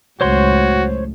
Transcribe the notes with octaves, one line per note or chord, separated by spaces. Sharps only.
C#2 F#2 A2 A3 F#4 C5 C#5 C6